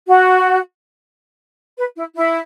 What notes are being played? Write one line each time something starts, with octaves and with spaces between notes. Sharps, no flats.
F#4
B4
E4
E4